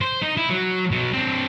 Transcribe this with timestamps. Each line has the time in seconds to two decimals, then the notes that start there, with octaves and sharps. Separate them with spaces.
0.01 C5
0.22 D#4
0.37 E4
0.50 F#3
0.91 B2 F#3
1.13 C4 D4